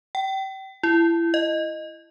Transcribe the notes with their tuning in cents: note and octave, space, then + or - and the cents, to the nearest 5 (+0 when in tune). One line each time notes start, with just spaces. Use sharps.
G5 -30
E4 +25
D#5 -5